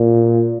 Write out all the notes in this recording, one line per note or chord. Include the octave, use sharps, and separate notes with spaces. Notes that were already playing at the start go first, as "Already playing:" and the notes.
Already playing: A#2